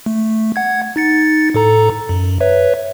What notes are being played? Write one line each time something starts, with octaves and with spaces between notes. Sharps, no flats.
A3
F#5 G#6
D#4 A6 C#7
A2 A4 A#5
F#2
B4 C#5 E5